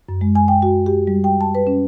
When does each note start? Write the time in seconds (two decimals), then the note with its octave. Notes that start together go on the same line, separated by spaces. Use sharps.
0.09 F#2
0.21 G#3
0.35 G#5
0.48 G5
0.62 F#4
0.86 G4
1.07 G3
1.24 G5
1.41 A5
1.55 B4
1.67 C#4